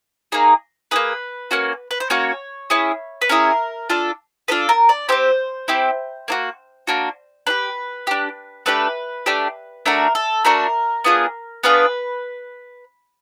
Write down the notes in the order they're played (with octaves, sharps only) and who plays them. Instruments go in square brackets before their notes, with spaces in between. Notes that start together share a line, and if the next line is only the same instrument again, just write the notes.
[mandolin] A#3 D#4 G#4
D#4 G#4 B4
A#3
A#3 C#4 F#4
B4
C5
A#3 C#4 F#4 C#5
C#4 E4 G#4
B4
C#4 E4 G#4 A#4
D4 F4 A4
D4 F4 A4 B4
A#4
D5
C4 E4 G4 C5
C4 E4 G4
A#3 D4 F#4
A#3 D4 F#4
D4 B4
G4
D4 G4
A3 D4 G4 B4
A3 D4 G4
A3 D4 F#4 A#4
A4
A3 D4 F#4 A#4
B3 D4 F4 G#4
B3 D4 F4 G#4 B4